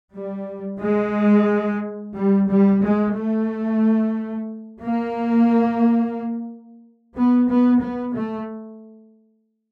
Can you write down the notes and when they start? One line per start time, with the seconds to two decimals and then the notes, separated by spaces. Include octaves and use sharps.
0.16 G3
0.82 G#3
2.15 G3
2.48 G3
2.82 G#3
3.15 A3
4.81 A#3
7.16 B3
7.48 B3
7.82 B3
8.14 A3